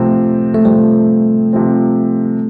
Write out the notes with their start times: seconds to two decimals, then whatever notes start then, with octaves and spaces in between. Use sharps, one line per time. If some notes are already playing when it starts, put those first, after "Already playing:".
Already playing: C3 F3 A3 C4
0.54 A3
0.65 C3 F3 G3 C4
1.53 C3 F3 C4